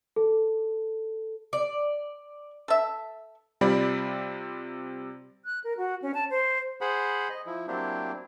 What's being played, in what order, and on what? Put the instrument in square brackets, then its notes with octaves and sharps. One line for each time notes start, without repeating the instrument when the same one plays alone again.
[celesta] A4
[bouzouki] D5
[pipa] A4 E5
[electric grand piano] C3 G3 C4 F4 D5 B5
[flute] F#6
A#4
F#4
C#4
A5
C5
[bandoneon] G#4 C5 F#5 B5
D#5
F3 E4
F#3 A#3 C4 D4 E4 G4